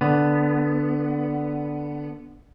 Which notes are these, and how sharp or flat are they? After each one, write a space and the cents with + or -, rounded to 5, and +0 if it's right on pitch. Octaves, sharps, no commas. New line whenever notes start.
D3 +0 B3 +5